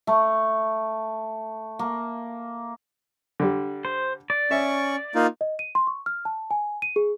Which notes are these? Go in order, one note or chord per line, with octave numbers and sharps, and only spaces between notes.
A3
A#3
D3 G3
C5
D5
C#4 E5 C#6
A#3 D#4 F4
D#5
D#7
C6
C#6
F6
A5
G#5
D#7
G#4